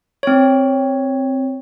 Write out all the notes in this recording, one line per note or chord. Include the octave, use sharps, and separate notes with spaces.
C4 C#5